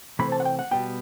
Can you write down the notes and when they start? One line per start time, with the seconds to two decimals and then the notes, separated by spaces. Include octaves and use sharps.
0.19 C3 E3 A3 C4 B5
0.32 A5
0.40 F#5
0.45 G5
0.59 F#5
0.71 B2 G3 B3 G5